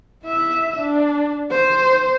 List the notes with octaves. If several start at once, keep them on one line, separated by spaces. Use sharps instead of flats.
E4 E5
D4
C5